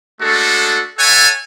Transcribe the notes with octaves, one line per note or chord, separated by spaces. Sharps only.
G#3 A3 D4 F#4 A4
A4 C#5 E5 F#5 G#5 A5